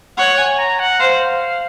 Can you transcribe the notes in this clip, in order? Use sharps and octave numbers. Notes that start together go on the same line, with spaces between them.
C#5 F#5
G#5
A#5
F#5
C5 F5